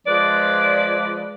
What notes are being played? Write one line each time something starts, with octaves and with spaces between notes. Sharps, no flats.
F3 G#3 B4 D5